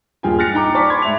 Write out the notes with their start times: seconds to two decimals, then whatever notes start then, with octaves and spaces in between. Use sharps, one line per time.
0.23 D#1 G2 F4 G#4 G5 G#5
0.39 F6 F#6 A6 A#6 C#7 F7
0.54 D#4 G5 A#5 D6
0.75 D5 A5 C#6 D6 B6
0.90 G5 B5 C6 D6 G#6
1.02 G#2 E5 F7